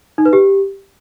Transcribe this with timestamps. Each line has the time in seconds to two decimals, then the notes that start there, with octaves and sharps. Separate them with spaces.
0.18 D#4
0.25 B4
0.33 G4